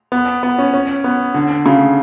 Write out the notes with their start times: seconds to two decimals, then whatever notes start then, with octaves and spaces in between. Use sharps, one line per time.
0.12 B3
0.43 B3
0.58 C#4
0.74 C#4
1.04 B3
1.34 D3
1.66 C#3